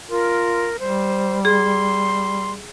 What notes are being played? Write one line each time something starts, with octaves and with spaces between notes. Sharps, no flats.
F4 A#4
G3 C5
G#4 C6